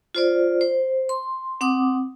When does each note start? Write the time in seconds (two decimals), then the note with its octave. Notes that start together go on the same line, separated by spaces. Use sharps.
0.15 F4 C5 D5
0.61 C5
1.09 C6
1.61 C4 F#5 D6 D#6